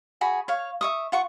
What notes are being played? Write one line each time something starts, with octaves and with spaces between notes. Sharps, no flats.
F#4 G#4 B5
C#5 F5
E5 C#6 D#6
F4 F#5 C#6